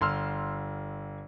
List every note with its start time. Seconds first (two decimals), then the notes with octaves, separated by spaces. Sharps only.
0.01 G1 C6 E6 F6